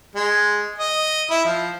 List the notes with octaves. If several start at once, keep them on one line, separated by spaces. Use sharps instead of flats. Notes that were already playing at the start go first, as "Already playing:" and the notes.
G#3
D#5
E4
F3